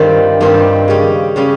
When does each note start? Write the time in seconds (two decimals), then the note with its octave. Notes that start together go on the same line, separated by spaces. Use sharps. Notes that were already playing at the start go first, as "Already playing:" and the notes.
Already playing: G2 D#3 G3 C4 F4
0.41 G2 D#3 G3 C4 F4
0.88 C#3 G3 C#4
1.36 C#3 G3 C#4